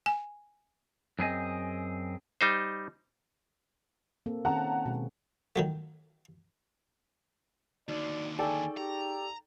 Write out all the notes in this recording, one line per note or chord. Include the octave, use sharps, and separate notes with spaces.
G#5
F#2 C4 G#4 D#5
G3 D#4 C5
A#3 C4 A4
D#3 C4 C#4 F#5 A5 A#5
B2 G#3
D#3 F#3 A3
D#2 D3 D#4 F#4 D5
D#4 G#4 A4 D5 G5 G#5 C#6
G4 A#5